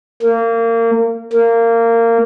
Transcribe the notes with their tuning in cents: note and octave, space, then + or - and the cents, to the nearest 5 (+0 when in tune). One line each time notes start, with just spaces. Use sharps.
A#3 -25
A#3 -20